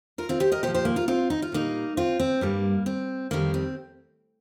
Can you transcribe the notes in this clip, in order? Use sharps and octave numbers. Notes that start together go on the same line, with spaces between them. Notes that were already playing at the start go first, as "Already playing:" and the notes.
F4 A#4
C4 F4
G4 C5
A#4 D#5
A#2 F3 G4 C5
G4 C5
A#3
F4 A#4
C4 F4
D#4
F4
A#2 G3 A#3 D#4
C4 F4
C4
G2 G3 A#3
C4
F2 D#3 G3 A#3
C4